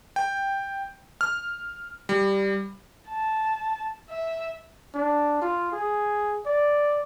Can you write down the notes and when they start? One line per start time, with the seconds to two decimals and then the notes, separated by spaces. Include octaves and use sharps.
0.16 G5
1.21 F6
2.09 G3
3.09 A5
4.10 E5
4.94 D4
5.42 F4
5.72 G#4
6.46 D5